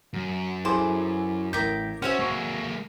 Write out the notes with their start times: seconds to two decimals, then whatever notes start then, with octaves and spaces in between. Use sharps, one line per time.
0.14 F#2
0.65 E4 G#4 A4 C5 G#5 D6
1.53 A1 A#4 D6 G6 B6
2.02 C#4 F#4 G#4 C5 E5 F6
2.19 G#3 A#3 C#6